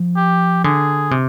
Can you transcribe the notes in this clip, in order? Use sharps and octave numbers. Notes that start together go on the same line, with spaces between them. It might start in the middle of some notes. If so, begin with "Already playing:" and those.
Already playing: F3
G4
D3 G#4
C3